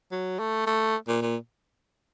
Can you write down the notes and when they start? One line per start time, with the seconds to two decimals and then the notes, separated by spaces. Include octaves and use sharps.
0.12 F#3
0.40 A3
0.67 A3
1.08 A#2
1.22 A#2